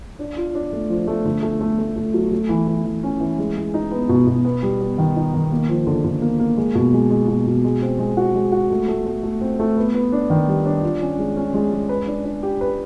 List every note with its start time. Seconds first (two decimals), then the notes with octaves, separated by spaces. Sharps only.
0.19 D4
0.37 F4
0.55 D4
0.73 A3
0.90 F3
1.07 A3
1.25 D3
1.43 A3
1.61 A3
1.79 A3
1.96 A3
2.14 F#3
2.32 A3
2.49 E3
2.67 E3
2.85 E3
3.03 C#4
3.20 E3
3.39 G#3
3.57 G#3
3.74 D#4
3.92 B3
4.09 B2
4.27 B2
4.45 B3
4.63 G3
4.81 B3
4.98 D#3
5.16 D#4
5.34 D#3
5.51 A#3
5.69 F3
5.87 D3
6.04 D3
6.22 A#3
6.39 A#3
6.57 G#3
6.75 B2
6.93 G#3
7.10 G#3
7.28 B2
7.47 B2
7.64 G#3
7.82 C4
7.99 G#3
8.17 F#4
8.34 G#3
8.52 F#4
8.71 A3
8.88 A3
9.06 A3
9.23 A3
9.41 C4
9.59 A3
9.77 B3
9.94 B3
10.12 D4
10.30 D#3
10.48 G3
10.66 D4
10.83 F4
11.01 C#4
11.19 G#3
11.36 C#4
11.54 G#3
11.72 G#3
11.89 B4
12.07 D4
12.24 D4
12.43 G4
12.61 B4